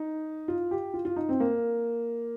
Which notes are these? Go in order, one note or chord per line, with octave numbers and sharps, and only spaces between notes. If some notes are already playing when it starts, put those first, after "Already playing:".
Already playing: D#4
F4
G4
F4
F4
D#4
C4
A#3